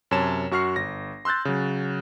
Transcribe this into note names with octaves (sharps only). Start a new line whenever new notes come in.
F#2 C3 C#5 A5 E7
F#2 F#4 C#6 F6 C7
G1 A#6
C6 E6 F#6 G6 A6
C#3 F#3